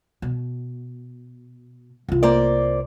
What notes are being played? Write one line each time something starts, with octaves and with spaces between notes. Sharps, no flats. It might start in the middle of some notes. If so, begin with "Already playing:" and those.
B2
C2 F4
A#3 C5 D5